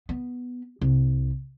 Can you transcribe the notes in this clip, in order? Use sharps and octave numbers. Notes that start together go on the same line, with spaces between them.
B3
C2